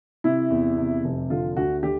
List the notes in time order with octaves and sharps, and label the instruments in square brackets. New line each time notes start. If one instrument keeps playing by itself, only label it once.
[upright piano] C3 E4
E2
C3
F1
D3 F4
D2 F#4
D3 G4